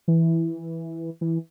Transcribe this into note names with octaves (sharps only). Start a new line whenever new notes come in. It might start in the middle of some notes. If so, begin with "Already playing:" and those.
E3
E3